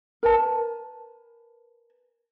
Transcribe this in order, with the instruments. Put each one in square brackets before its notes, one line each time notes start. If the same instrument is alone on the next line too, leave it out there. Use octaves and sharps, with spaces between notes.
[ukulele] A#4 B4 G#5 A5